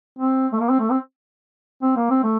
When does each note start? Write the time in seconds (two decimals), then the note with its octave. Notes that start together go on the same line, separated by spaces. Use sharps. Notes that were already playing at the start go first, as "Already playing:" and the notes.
0.19 C4
0.53 A3
0.60 A#3
0.69 C4
0.80 A3
0.90 C4
1.82 C4
1.96 A#3
2.10 C4
2.24 A3